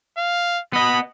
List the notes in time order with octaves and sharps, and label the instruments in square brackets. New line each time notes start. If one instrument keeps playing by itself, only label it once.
[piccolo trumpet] F5
[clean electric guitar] B3 D#5 [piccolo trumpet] B5